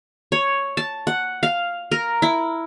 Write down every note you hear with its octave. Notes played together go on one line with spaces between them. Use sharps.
C#5
A5
F#5
F5
A#4
E4